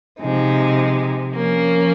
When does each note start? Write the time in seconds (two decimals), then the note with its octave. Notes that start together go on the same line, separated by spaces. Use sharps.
0.20 C3 F3 G#3 D#4
1.33 F3 A#3 C#4